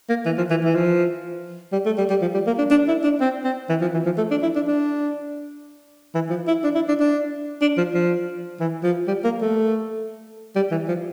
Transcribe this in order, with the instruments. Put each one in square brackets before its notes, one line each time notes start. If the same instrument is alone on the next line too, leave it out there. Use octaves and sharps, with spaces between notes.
[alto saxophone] A#3
E3
F3
E3
E3
F3
G3
A3
G3
G3
F3
G3
A#3
D4
D4
E4
D4
C4
C4
E3
F3
E3
F3
A3
D4
E4
D4
D4
E3
F3
E4
D4
E4
D4
D4
D4
F3
F3
E3
F3
G3
A#3
A3
G3
E3
F3